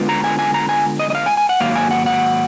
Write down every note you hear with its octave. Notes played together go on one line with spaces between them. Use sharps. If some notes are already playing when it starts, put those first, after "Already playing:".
Already playing: D3 G#3 B3 F4
A#5
G#5
G#5
A#5
G#5
D#5
D#5
F5
G#5
G#5
F#5
G#2 D#3 F#3 A#3 F5
G#5
F#5
F#5